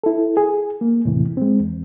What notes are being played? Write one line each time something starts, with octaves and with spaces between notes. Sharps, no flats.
E4 A4
G#4
A#3
E2 A2 C3 E3
G#3 C4
E2